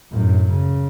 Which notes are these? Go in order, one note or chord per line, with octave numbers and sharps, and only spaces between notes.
F#2 A2
C#3